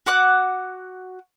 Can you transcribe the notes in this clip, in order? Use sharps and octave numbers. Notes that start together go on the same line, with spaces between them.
F#4 F#5 D6 F#6